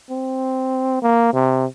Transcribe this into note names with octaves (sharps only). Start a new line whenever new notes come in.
C4
A#3
C3